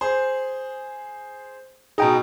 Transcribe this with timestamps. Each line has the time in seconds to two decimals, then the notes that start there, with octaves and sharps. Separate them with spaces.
0.01 G#4 C5
1.98 B2 D#4 G#4 G5 A#5